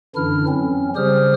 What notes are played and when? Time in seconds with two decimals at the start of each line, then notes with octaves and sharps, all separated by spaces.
0.16 F#2 D3 E3 D4 E4 F6
0.48 F#3 C4 C#4
0.96 C#3 G3 G4 C5 D#6 F6